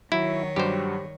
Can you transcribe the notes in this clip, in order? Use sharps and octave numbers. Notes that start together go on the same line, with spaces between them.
D#3 F#3 E4 C#5
G2 F#3 G3 G4 C5